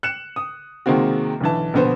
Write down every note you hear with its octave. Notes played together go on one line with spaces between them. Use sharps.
F#6 C#7 E7
D#6
C3 D#3 G#3 A#3 C4 F#4
B1 D3 E3 A5
A#1 B2 D3 B3 B4 C5